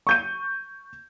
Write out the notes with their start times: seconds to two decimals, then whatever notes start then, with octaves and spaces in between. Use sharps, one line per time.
0.07 C#6 G6 D#7